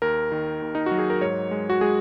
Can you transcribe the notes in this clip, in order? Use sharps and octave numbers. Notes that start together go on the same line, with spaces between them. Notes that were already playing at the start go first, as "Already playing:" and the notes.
D#2 A#4
D#3
D#2
D#4
F#4
F#3
G#4
A#4
G#2 C#5
G#3
F#4
G#3 G#4